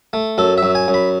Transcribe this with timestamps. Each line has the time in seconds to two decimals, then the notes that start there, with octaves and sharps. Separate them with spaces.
0.13 A3
0.38 F#2 A4
0.58 E5
0.63 F#2
0.75 G#5
0.88 F#2
0.94 B5